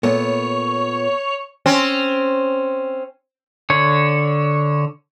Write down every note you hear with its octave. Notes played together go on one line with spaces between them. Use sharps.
A#2 A3 B3 C#5
C4 C#4
D3 C#5